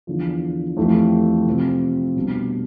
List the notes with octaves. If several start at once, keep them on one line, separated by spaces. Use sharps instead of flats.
E2 D3 F3
F2 E3 A3 E4 G4
C3 F3 C4
B2 G3 D4